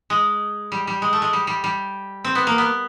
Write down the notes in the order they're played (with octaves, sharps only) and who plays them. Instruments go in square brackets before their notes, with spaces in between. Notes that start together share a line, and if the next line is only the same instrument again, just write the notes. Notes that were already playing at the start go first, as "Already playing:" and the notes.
[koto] G#3
G3
G3
G#3
A3
G#3
G3
G3
G3
C4
B3
A#3
B3